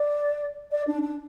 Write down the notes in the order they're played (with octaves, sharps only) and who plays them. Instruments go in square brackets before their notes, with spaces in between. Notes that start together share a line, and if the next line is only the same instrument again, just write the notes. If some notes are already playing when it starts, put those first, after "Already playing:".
Already playing: [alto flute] D5
D5
D4
D4